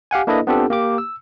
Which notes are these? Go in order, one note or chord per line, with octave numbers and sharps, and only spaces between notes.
G4 F5 F#5 G#5
A#3 D4 E4 A4 B4 D#5
B3 C4 D4 F4 G4 A4
A#3 G4 D6
E6